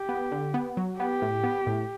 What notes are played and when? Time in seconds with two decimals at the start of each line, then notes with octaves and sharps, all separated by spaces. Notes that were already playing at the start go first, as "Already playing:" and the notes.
Already playing: G4
0.09 B3
0.32 D3
0.54 B3
0.77 F#3
0.99 B3 G4
1.22 A2
1.44 B3
1.67 A2